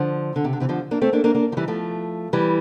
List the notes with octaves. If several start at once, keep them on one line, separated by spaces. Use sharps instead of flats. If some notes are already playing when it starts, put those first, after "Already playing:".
Already playing: D3 F3
D3
C3
D3
C3 E3
D3 F3
A#3 D4
A3 C4
A#3 D4
A#3 D4
A#3 D4
F3
E3 G3
F3 A3
E3 G3